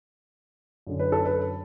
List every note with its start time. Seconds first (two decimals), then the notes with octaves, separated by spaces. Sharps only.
0.87 F#2 D3
0.99 B4
1.12 A4
1.25 B4